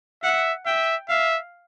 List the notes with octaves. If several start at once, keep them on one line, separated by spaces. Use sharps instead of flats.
E5 F#5
E5 G5
E5 F5